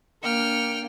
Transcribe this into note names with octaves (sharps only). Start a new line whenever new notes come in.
A#3 D4 G5 F6 C#7